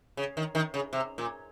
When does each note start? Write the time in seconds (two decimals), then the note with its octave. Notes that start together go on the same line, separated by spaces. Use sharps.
0.17 C#3
0.37 D#3
0.55 D#3
0.74 C#3
0.93 C3
1.18 A#2